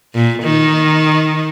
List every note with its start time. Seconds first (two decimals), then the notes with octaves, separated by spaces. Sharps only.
0.15 A#2
0.43 D#3